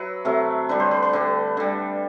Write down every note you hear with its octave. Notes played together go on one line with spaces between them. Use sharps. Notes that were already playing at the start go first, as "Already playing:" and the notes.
Already playing: F#3 B4 E5
C3 F#3 A3
D3 G3 B4
C5
B4
B4
D3 G3 G4
D3 G3